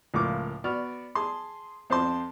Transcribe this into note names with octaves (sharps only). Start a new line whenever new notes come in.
C#2 A2 F3 A#3 C#6 D6
B3 F#4 D5 F6
G#4 A5 C6
F2 C5 A5 C6